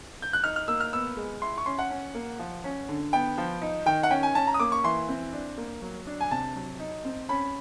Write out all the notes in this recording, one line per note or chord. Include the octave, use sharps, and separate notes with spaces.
G6
F#6
D#4 F6
F6
A#3 E6
F6
B3 E6
G#3
E4 C6
C#6
C#4 C6
F#5
C#4
A#3
F3
C#4
D3
B3 G5
F3
D#4
D#3 G5
F#5
C#4 G5
G#5
C#4 A5
A#5
D#6
A#3 D6
C#6
E3 C6
C4
D4
A#3
F#3
D4
G#5
C3 A5
F#3
D#4
C4
C#4 B5